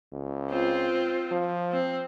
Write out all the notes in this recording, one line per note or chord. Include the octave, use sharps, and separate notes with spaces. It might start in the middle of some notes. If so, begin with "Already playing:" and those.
C#2
C4 F4
F3
C4